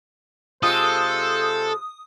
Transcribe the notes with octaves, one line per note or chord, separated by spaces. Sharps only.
C3 G#3 F4 A4 C5 D#6